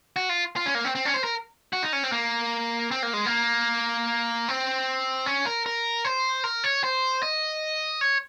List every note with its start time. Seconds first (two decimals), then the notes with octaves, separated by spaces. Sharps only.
0.16 F#4
0.29 F4
0.56 F4
0.66 C#4
0.75 A#3
0.85 C4
0.95 C4
1.05 C#4
1.14 C5
1.24 A#4
1.73 F#4
1.83 D#4
1.93 C#4
2.03 C4
2.12 A#3
2.91 C4
3.03 A#3
3.13 G#3
3.26 A#3
4.49 C4
5.26 C#4
5.46 A#4
5.66 A#4
6.04 C5
6.44 A#4
6.64 C#5
6.84 C5
7.23 D#5
8.01 C#5